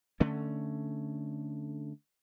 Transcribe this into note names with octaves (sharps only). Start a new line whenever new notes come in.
D3 A3 C#4